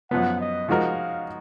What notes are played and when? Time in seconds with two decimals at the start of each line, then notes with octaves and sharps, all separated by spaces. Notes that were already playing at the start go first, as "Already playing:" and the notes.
0.11 F#2 F3 B3 F#5
0.40 D#5
0.69 F3 G#3 D#4 F#4 A#4 F5